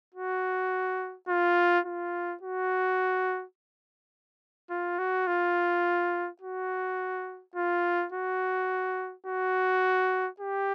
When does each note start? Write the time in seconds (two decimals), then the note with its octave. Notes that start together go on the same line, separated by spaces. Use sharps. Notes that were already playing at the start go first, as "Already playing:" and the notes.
0.15 F#4
1.29 F4
1.85 F4
2.43 F#4
4.70 F4
4.99 F#4
5.27 F4
6.41 F#4
7.55 F4
8.12 F#4
9.27 F#4
10.40 G4